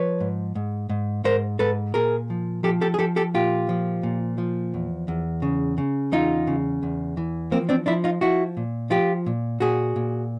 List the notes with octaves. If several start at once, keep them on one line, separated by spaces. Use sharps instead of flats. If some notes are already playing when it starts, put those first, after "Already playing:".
Already playing: F3 B4 C#5
G#2
G#2
G#2
G#2 A#4 C5
G#2 A4 B4
A#2 G#4 A#4
F3
F3 G4 A4
G4 A4
G#4
F3 G4 A4
G4 A4
A#2 F4 G4
F3
A#2
F3
E2
E2
C#3
C#3
E2 D#4 F4
C#3
E2
E3
F3 A#3 C4
C4 D4
F3 D4 E4
D#4 F4
F3 E4 F#4
A#2
F3 F4 G4
A#2
A#2 F#4 G#4
A#2